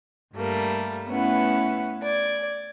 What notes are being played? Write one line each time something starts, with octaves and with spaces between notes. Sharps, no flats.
G2 G3 A3 A#3
A3 B3 C#4 E4 B4 F#5
D5 G#6